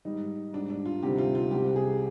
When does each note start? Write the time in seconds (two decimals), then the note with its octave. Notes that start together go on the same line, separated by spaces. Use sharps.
0.05 G#2 D#3 G3 D#4
0.53 G#2 G3 D4
0.70 D4
0.86 F4
1.03 D2 C3 D#3 G3 G4
1.18 F4
1.35 F4
1.51 C2 C3 G3 G4
1.76 G#4